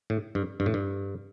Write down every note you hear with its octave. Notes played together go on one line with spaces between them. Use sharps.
A2
G2
G2
A2
G2